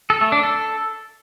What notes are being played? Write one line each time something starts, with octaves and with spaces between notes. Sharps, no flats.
A4
A3
D4
A4